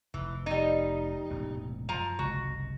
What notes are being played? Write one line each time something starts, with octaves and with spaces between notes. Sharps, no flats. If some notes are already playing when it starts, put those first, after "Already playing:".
F1 E3
G3 D#4
E1 A1 C3
F#2 F3 A#5
F#1 C2 G#3 F#4